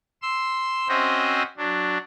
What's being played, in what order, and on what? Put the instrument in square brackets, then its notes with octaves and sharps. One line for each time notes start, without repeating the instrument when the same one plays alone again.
[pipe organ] C6 E6
C4 C#4 F#4 C5 D#5 E5
F#3 D4